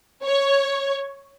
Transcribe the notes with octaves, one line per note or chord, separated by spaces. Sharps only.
C#5